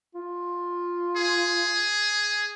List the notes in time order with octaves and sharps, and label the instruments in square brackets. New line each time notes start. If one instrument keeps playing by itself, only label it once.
[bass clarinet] F4
[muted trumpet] G#4